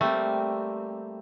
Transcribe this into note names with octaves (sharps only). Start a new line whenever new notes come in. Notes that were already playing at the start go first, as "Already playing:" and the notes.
G3 A3 A#3 C4